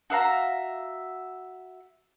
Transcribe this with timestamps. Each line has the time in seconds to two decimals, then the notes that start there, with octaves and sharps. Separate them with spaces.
0.10 F#4 E5 F5 A#5